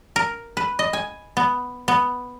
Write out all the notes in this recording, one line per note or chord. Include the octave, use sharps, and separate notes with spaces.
A#4
B4
D#5
G#5
B3
B3